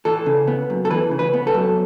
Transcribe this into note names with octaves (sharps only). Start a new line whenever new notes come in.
E3 A4
C#3
B3
F#2
A4
E3 B4
C#3
B4
B3
A4
F#2